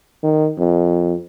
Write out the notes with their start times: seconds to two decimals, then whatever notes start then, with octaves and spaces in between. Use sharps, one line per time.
0.24 D#3
0.59 F2